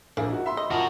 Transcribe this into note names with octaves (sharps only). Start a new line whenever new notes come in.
A#1 A#3 E4 G#4
D#4 F#4
E5 B5 C6
D#5
F4 F#4 A#4 A5